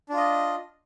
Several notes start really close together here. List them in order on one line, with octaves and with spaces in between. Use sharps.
D4 F4 D#5